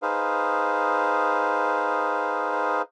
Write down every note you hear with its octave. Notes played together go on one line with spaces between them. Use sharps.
D#4 G#4 B4 C5 F5